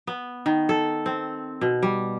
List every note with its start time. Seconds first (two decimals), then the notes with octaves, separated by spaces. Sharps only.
0.07 B3
0.46 D#3
0.69 A4
1.06 C4
1.61 B2
1.83 G3